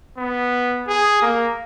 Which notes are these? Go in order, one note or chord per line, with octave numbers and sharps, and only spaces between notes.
B3
G#4
A#3